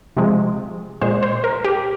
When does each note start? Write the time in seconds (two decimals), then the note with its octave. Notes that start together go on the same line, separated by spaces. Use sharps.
0.17 C3 F3 G#3
1.02 A#2 G#3 C5
1.23 C5
1.44 A#4
1.65 G4